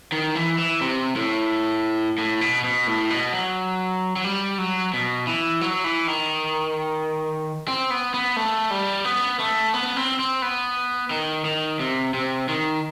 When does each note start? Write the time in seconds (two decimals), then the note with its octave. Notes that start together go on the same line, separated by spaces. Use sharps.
0.12 D#3
0.35 E3
0.58 E3
0.81 C3
1.16 A2
2.18 A2
2.41 B2
2.64 B2
2.87 A2
3.10 B2
3.33 F#3
4.16 F#3
4.24 G3
4.58 F#3
4.94 B2
5.27 E3
5.61 F#3
5.84 E3
6.07 D#3
7.68 C4
7.90 B3
8.14 B3
8.36 A3
8.71 G3
9.05 B3
9.39 A3
9.74 B3
9.96 C4
10.19 C4
10.42 B3
11.11 D#3
11.45 D#3
11.80 C3
12.14 C3
12.48 D#3